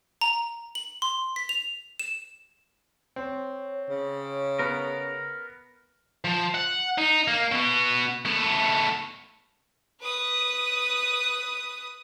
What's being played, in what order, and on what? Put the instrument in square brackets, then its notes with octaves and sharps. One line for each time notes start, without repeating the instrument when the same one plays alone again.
[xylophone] A#5
F#7
C6
B6
F7
E7
[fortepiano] C4 [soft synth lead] C#5
[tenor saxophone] C#3
[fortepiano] B3 [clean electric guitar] A#4
[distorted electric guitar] F3
F#5
D#4
A#3
B2 B3
A3 B3
[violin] B4 D#6